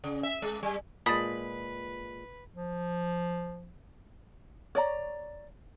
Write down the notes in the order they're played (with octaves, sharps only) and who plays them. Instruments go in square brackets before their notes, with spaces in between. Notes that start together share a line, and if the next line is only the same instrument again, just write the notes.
[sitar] C#3
E5
G#3
G3
[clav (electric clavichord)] A#2 G#3 [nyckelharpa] B4 [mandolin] B5 [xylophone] D#6 A6
[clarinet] F3
[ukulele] C#5 D5 A#5